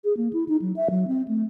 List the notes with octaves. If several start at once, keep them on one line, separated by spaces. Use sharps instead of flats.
G#4
A#3
E4
D#4
F#3
E5
F#3
C4
A3